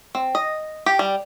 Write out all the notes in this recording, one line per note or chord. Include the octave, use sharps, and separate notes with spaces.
C4
D#5
G4
G3